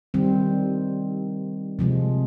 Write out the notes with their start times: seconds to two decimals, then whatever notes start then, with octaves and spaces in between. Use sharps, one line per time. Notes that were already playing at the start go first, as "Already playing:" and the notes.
0.14 D#3 G3 C4
1.79 C3 F3 G#3